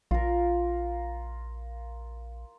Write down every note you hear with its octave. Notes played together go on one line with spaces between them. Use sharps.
A#1 F4 A#4